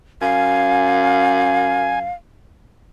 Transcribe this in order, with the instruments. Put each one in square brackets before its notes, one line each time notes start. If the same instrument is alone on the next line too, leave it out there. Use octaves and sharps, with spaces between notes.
[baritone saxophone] F#2 [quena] F5 [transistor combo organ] G#5